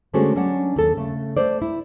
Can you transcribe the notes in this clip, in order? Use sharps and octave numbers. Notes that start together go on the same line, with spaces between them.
D3 G#3 A3 C#4 F#4 C5
F#3 C#4 D4 C#5 F#5
D#2 A4
C#3 A3
A3 C5 D5
E4